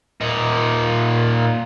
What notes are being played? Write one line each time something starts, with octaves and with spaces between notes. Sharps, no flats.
A#2 D#4